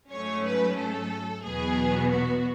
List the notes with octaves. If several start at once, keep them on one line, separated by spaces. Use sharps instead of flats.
G#2 F#3 A3 C#4 C#5
B4
A4
E2 B2 F#3 B3 G#4
F#4